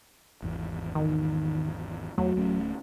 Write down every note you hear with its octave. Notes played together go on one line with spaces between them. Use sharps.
G#1 E2
D#3
E2 F#3 A3
D1 A3 C#4